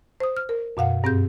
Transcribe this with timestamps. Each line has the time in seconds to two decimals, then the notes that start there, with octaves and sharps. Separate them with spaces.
0.20 C5 D#6
0.37 F6
0.49 A#4
0.77 F#2 B2 F5 F#5
1.04 G2 C4 G#4 G6